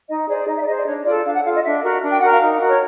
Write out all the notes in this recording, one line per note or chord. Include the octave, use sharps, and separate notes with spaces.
D#4 D#5
G#4 C5 D5
D5
D#4 D#5
E5
D5
G#4 C5 D#5
D5
D4 C#5
F4 A4 D5
D4 F5
F#5
F4 A4 F5
D#5
D4 E5
F#4 A#4
D4
G5
F#4 A#4 F#5
F5
D#4
F#4 A#4
C#5